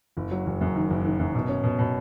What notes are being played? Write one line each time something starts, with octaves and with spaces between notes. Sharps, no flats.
F#1
F#3
F#1
F#2
D#3
F#1
D#3
F#2
B2
C#4
B2
B2